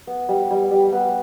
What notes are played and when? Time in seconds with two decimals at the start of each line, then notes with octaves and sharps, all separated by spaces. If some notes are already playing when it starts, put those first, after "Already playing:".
0.07 B3
0.29 G3
0.51 G3
0.71 G3
0.92 B3